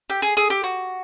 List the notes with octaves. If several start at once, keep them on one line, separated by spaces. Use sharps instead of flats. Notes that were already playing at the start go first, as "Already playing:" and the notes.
G4
G#4
G#4
G4
F#4